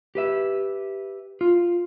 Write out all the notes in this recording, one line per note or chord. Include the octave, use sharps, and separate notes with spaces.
G4 B4 E5
F4